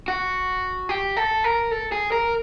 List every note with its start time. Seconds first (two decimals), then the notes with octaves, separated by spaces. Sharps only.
0.08 F#4
0.89 G4
1.17 A4
1.44 A#4
1.71 A4
1.92 G#4
2.12 A#4